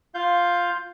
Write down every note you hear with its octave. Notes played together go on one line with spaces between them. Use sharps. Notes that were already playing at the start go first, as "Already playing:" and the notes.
F4 F5 G6